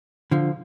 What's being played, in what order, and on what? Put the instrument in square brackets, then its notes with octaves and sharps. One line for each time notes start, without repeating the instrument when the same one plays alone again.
[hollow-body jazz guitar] D3 F3